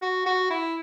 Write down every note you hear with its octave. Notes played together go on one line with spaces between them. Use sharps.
F#4
F#4
E4